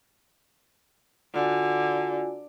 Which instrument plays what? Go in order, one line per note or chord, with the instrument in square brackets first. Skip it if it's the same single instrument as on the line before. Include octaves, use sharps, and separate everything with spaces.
[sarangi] D3 [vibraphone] F4 F#4 G#5